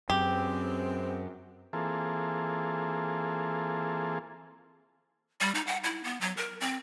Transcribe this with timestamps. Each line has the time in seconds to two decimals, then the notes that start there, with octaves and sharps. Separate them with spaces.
0.10 F#2 G#3 B3 C4 G4
1.73 E3 A#3 C4 F4 G#4 A4
5.40 G3
5.55 D#4
5.67 F#5
5.84 E4
6.04 B3
6.21 F#3
6.37 A#4
6.60 C4